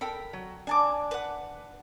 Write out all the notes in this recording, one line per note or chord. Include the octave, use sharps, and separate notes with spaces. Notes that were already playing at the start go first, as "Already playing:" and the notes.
A4 A#4 G5 B5
F#3
D4 G#5 A5 D6
B4 F#5